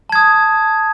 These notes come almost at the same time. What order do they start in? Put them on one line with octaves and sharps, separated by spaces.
A5 G#6 D#6